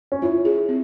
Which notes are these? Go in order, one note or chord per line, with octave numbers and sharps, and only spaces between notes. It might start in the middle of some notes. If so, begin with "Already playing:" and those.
C#4
E4 F4
G#4
C4